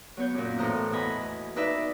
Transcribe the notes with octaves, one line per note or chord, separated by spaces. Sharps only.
F#3 B3 C#5 G6
F#2 A#2
A2 E3 C5 A#5 D#6 F#6
E2 B2 F#4 D#5 G#5 B5
D#4 B4 D5 E5